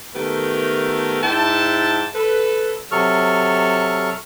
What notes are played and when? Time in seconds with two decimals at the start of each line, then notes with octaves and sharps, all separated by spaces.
0.14 D#3 A3 B3 G4 A4 A#4
1.23 G#2 E4 G5 A5
2.15 A4 B4
2.92 C3 F#3 A4 C#6 F6